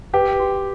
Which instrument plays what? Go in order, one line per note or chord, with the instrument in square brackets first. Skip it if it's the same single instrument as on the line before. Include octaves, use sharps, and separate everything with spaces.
[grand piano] G4 [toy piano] B4
[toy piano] F#4